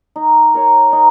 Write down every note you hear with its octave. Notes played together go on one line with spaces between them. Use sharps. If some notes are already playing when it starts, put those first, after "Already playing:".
D#4
A#4 C#5
D#4